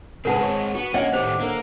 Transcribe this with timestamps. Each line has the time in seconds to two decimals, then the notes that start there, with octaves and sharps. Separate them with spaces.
0.25 C#3 G#3 C4 G#4 A#4 B4 F#5 A5
0.41 G#4 C#5
0.75 B3 F#4
0.94 D2 A#3 C#4 D#5 F#5
1.13 A2 D#3 A3 G4 C5 D5
1.40 D3 A#3 A#4